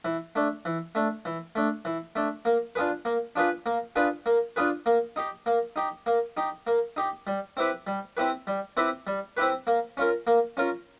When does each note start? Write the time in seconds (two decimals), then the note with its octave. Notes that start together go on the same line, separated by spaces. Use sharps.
0.05 E3
0.35 A3 D4
0.65 E3
0.95 A3 D4
1.25 E3
1.55 A3 D4
1.85 E3
2.16 A3 D4
2.45 A#3
2.75 D4 F4 G#4 B4
3.05 A#3
3.36 D4 F4 G#4 B4
3.66 A#3
3.96 D4 F4 G#4 B4
4.26 A#3
4.56 D4 F4 G#4 B4
4.86 A#3
5.16 D#4 G4
5.46 A#3
5.76 D#4 G4
6.06 A#3
6.37 D#4 G4
6.67 A#3
6.96 D#4 G4
7.27 G3
7.57 C4 E4 G4 B4
7.87 G3
8.17 C4 E4 G4 B4
8.47 G3
8.77 C4 E4 G4 B4
9.07 G3
9.37 C4 E4 G4 B4
9.67 A#3
9.97 C#4 F4 A#4
10.27 A#3
10.57 C#4 F4 A#4